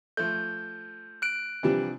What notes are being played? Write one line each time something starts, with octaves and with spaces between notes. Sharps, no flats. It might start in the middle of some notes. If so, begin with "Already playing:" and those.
F3 A3 G6
F#6 D7
C3 E3 F3 G3 D4